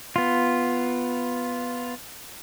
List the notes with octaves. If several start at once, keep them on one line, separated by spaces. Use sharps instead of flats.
B3 F4